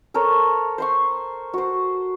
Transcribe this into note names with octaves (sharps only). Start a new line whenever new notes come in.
A4 A#4 C5 C#5
C5 C6 C#6
F#4 C5